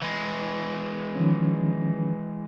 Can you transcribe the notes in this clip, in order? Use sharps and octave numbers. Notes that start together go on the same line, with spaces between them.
E3 G#3
D#3 F3 C#4